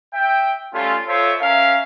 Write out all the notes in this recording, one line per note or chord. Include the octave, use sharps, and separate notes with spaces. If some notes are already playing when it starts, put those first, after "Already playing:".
E5 G5
G3 A3 C#4 F4
F4 A4 C5 C#5 E5
C#4 A#4 E5 F5